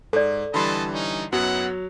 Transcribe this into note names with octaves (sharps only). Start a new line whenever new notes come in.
G#2 A4 D5
D3 E3 G3 A3 D#5 A5 B5 C6
C#4 D#4
F#2 F#3 B3 D#4 E4 F#4 F#5